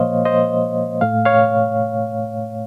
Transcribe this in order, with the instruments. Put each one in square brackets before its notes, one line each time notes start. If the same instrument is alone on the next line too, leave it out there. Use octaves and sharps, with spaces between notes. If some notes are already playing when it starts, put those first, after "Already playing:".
Already playing: [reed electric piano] A#2 F3 A#3 C5 C#5 D#5 F5
C5 D#5
A2 A3 F5
C#5 F5